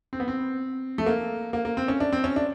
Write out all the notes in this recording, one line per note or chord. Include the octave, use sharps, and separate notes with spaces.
C4
B3
C4
A3
A#3
A#3
A#3
C4
C#4
D4
C4
C#4
D4